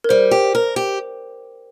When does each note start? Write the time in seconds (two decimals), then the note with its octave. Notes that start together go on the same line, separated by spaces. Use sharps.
0.04 A#4
0.09 G3 C5
0.31 G4
0.55 A#4
0.76 G4